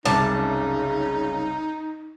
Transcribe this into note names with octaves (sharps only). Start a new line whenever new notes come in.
F#1 C2 C#3 D#4 A5 D6